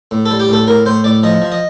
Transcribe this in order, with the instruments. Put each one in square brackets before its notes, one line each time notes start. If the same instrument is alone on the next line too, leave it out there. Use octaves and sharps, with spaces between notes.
[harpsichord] A2
A4
G3
G4
A2 A4
A2 A#4
A2 C5
A2 D5
F3 D#5
F3
D#5